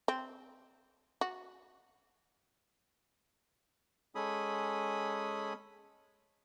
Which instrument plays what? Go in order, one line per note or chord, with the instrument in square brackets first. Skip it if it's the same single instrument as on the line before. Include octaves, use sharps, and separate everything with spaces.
[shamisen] C4
F#4
[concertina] G#3 C#4 A4 G#5 B5 D#6